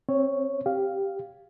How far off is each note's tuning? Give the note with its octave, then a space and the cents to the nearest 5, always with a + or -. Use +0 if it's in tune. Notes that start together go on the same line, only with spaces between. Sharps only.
C4 +25 C#5 +0
G4 +0 F5 +0